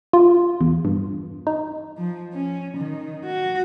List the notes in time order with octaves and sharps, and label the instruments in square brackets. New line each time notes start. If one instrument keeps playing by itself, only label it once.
[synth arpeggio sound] F4
E2
G2
D#4
[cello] F3
C#4
D#3
F#4